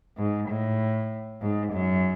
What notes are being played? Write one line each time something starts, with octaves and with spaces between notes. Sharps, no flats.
G#2
A2
G#2
F#2